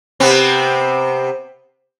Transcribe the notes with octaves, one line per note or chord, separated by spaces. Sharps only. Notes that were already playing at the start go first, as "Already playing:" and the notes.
C3 B3 C4